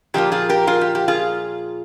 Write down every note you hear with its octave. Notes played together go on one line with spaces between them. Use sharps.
A#2 F3 A#3 F4 G4
F4 G#4
G4 A#4
F4 G#4
G4
G4
F4 G#4